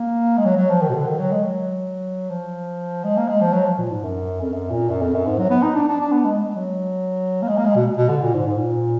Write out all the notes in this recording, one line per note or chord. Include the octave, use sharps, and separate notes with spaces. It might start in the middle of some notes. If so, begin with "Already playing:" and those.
Already playing: A#3
G#3
F#3
F#3
F3
D#3
B2
D3
D#3
F#3
G#3
F#3
F3
G#3
A#3
G#3
F3
F#3
F3
A#2
G#2
F#2
F2
F#2
A#2
F#2
F2
F#2
G#2
F#3
B3
D#4
D4
D4
D4
B3
G#3
G#3
G#3
F#3
A#3
G#3
A#3
G#3
B2
B2
D3
A#2
G#2
G#2
A#2